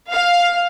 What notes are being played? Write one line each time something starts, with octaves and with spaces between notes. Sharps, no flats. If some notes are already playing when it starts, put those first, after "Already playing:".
F5